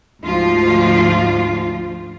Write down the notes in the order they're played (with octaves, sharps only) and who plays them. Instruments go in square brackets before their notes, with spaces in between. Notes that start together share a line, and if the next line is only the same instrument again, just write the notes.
[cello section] D2 G#2 F3 F4